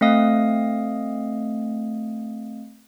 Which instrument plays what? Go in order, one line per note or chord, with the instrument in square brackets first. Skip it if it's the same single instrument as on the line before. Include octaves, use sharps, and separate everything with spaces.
[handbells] A3 C4 D#5 F5 D#6